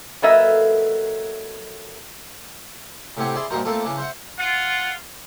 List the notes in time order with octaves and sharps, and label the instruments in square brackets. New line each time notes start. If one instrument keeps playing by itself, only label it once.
[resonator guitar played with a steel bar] F#3 A#3 A4 B4 D#5 E5
[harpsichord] A2 C3 C4 G4 F#5 G#5
E4 G#4 D5 E5 C6
G2 A#2 D#4 F#4 A#4 C5
A3 A#3 C4 D4 F4 A4
C#3 E3 D4
C5 E5 F#5
[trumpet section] F4 [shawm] F#5